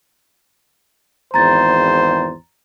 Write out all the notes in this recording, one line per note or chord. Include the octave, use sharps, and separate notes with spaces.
G#1 E2 C5 A#5 A6